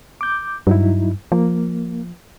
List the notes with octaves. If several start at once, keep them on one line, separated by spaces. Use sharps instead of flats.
D6 G6
G2 F#3 D#4 E4
F3 A#3